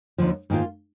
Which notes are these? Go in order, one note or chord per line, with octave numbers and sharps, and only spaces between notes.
D#2 D3 F3
G#2 D#3 A#3 F4